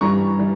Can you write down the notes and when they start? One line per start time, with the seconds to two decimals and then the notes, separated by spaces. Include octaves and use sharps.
0.01 G2 E3 G3 A#5 C#6
0.39 E3 G3